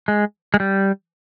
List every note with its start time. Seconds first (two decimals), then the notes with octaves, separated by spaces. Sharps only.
0.08 G#3
0.54 G#3
0.60 G3